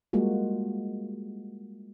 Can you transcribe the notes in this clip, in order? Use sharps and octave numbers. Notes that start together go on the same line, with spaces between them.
G3 G#3 A#3 F4 F#4